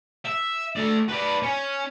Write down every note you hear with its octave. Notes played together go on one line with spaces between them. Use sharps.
E5
A3 D5
B4 D5
C#4